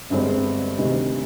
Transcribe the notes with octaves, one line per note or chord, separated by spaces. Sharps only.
G1 G2 D3 G#3 C4
D2 C3 D#3 G3